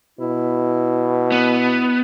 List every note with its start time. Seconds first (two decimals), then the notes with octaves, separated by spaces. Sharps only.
0.19 B2 E4
1.32 B3